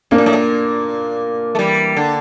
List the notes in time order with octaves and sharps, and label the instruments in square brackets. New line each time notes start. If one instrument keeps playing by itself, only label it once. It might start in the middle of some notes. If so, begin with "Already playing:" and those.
[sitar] C3 [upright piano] A#3 D4
[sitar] A#2
A2
A#2
A3
E3 G3
D3